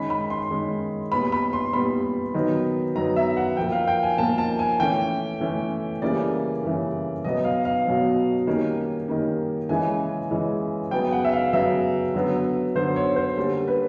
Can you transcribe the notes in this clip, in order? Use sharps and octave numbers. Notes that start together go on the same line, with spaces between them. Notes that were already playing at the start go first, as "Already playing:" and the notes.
Already playing: D#3 G#3 C#4 B5
B5
C6
D#3 G#3 C#4
A#2 G3 B3 B5
B5
C6
A#2 G3 B3 B5
D#3 F#3 B3
D#3 F#3 B3 A#5
E5
F#5
A#2 F3 A#3 G5
F5
G5
G#5
A#2 F3 A#3 A5
A5
G#5
E3 A3 C#4 G5
E3 A3 C#4
C#3 E3 G3 A#3 C#4 D5
C#3 E3 G3 A#3 C#4
B2 F#3 B3 D#5
F5
F5
B2 F#3 B3
D#3 G3 A#3 C#4
D#3 G3 A#3 C#4
C#3 E3 G#3 C#4 G#5
C#3 E3 G#3 C#4
C#3 F#3 B3 G5
F#5
E5
F5
C#3 F#3 B3 E5
D3 F#3 B3
D3 F#3 B3 C5
C#5
C5
D3 G3 A#3 C#4
B4